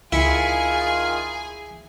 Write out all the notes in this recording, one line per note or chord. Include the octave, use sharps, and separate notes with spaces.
C#2 D#3 E4 F4 G#4 G#5 B6 C#7